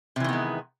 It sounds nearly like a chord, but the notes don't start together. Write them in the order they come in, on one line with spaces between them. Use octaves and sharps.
C3 E3 D#3 B3 G#3